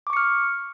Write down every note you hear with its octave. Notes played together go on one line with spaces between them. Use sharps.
C#6 D6 F6 C#7